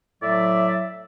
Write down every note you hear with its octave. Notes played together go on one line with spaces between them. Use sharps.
A2 F#3 D5 E5